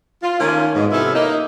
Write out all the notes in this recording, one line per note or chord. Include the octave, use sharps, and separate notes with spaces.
F4
D#3 A3 A#3 C#4 F4
G#2 B2
C3 F3 B3 C#4 E4 A4
A#3 D#4